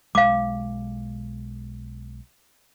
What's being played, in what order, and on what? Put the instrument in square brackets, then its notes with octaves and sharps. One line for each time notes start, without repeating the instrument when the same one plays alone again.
[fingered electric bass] B1 G#3 [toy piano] F5 D6